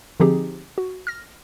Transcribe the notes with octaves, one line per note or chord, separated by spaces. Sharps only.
D3 F3 C4 D#4 G4 G#4
F#4
F6 A#6